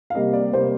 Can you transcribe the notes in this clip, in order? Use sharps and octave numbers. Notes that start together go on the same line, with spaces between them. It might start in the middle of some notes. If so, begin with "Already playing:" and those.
F5
C3 G3 A#3 D#5
D5
C3 G3 A#3 C5